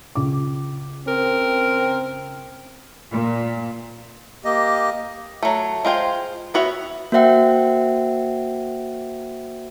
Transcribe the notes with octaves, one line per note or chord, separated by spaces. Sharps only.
C#2 D6
C4 A#4
A#2
A#3 G4 D#5
F#3 A3
G#3 F4 C5 G5
B3 F#4 C#5 E5
A#3 F#4 C5 E5 F#5 G5